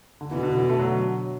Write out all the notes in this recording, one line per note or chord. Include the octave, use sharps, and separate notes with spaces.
D3
B2 E3
D3
E3
A3
D3 F#3